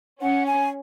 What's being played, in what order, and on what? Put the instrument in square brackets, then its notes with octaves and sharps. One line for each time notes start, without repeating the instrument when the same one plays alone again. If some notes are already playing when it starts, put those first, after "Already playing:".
[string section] C#4 [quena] F#5
[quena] G#5